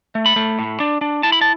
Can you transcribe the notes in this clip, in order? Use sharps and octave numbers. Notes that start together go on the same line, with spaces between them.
A3
B5
A3
A2
D4
D4
E4 A5
B5
A5